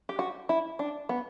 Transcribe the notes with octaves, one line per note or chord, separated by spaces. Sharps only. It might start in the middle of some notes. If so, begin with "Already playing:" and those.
G4
F#4
E4
D4
B3